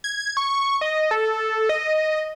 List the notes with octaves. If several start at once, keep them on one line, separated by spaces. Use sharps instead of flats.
G#6
C#6
D#5
A4
D#5